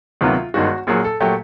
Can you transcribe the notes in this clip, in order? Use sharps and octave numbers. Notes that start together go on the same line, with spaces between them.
D2 C3 D#3 F#3 B3 F4
G1 G2 D#3 G#3 F#4
A#1 A#2 F#3 G#4
A4
A#2 F#3 A3 G4